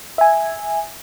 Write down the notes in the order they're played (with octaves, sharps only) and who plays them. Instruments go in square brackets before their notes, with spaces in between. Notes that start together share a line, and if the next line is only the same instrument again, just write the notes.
[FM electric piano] E5 G#5